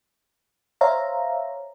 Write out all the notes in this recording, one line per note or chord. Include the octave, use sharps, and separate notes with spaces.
C5 C#5 E5 F5 A#5